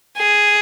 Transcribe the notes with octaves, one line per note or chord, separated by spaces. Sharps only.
G#4